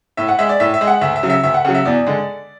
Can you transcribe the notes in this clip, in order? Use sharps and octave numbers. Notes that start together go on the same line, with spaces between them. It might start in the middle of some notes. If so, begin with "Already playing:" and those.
A2 E5
F#5
G#3 E5
D5
A2 E5
E5
G#3
F#5
D2 E5
E5
C#3 F#3
E5
D2 E5
F#5
C#3 F#3 F#5
E5
E2 D5
D3 G#3